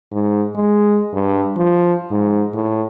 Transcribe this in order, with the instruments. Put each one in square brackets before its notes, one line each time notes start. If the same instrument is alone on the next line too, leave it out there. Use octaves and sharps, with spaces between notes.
[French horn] G#2
G#3
G2
F3
G#2
A2